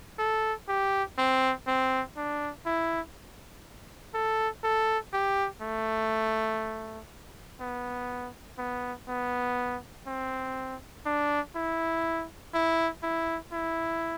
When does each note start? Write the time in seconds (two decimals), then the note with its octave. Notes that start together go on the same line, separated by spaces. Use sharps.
0.19 A4
0.68 G4
1.18 C4
1.67 C4
2.17 D4
2.66 E4
4.14 A4
4.64 A4
5.13 G4
5.62 A3
7.60 B3
8.58 B3
9.08 B3
10.07 C4
11.06 D4
11.55 E4
12.54 E4
13.03 E4
13.53 E4